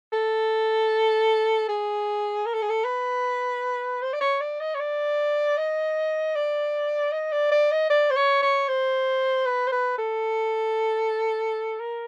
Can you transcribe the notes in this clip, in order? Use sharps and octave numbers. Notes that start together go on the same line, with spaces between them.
A4
G#4
A#4
A4
G#4
A4
B4
C5
D5
C#5
D5
D#5
C#5
D5
D#5
D5
D#5
D5
D5
D#5
D5
C5
C#5
C#5
C5
B4
C5
B4
A4
A#4